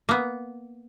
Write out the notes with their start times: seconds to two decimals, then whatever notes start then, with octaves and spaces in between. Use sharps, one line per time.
0.09 A#3 B3